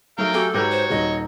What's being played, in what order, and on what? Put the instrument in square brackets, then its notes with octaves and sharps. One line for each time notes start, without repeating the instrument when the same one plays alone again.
[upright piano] F#3 A3 [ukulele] D#4 [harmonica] A#4 F5 G5
[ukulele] F#4 G4 G#5 [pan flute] A4
[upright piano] G#2 A#6 [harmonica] F#4 C#5 [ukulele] G4 B4 A#5
[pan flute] C5
[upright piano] D#1 D#4 [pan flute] D#5